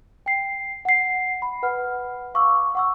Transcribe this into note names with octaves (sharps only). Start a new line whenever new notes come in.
G5 C7
F#5 C7
B5
B4 F#5 F6
F5 C#6 D6 E6
F#5 C#6 E6